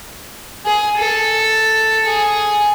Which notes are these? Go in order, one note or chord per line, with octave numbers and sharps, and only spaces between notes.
G#4
A4
G#4